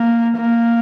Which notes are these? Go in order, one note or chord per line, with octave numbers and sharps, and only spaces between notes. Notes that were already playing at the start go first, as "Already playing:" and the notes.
Already playing: A#3
A#3